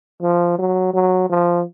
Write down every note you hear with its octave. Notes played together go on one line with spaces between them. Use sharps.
F3
F#3
F#3
F3